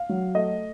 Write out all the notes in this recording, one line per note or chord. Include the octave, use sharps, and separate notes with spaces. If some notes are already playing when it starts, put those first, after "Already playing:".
Already playing: F5
F#3
A3 D#5